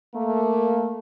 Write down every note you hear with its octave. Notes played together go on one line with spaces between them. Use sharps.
A3 A#3